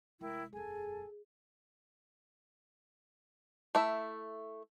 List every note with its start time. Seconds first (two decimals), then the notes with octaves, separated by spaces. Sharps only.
0.21 F1 G#3 E4 A#4 G5
0.53 E1 F#2 G#4 A4 G#5
3.75 A3 E4 E5